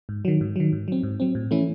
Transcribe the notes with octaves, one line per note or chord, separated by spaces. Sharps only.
G#2
D#3 F#3
G#2
D#3 F#3
G#2
F#3 C4
G#2
F#3 C4
A2
E3 A3 C#4 E4